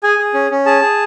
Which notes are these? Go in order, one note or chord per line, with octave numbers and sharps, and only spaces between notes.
G#4 G#5
G#4
C#4
C#4
G#4 A5
G#4